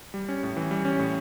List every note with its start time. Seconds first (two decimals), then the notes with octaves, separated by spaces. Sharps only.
0.14 G3
0.29 C#4
0.43 A2
0.57 E3
0.71 G3
0.85 C#4
0.99 A2